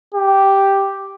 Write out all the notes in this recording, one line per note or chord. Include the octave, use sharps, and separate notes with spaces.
G4